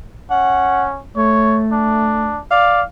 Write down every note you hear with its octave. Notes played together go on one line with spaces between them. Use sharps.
C#4 F#5
A3 C#5
D4
D5 F5